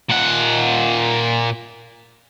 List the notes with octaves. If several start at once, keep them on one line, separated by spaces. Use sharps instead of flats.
A#2 F#5